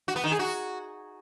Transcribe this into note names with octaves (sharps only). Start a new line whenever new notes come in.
F#4
B3
D#3
G#4
F#4